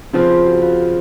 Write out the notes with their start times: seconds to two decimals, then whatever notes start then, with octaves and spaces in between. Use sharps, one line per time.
0.13 C#3 F3 C4 F4
0.30 F4
0.46 F#4
0.62 F4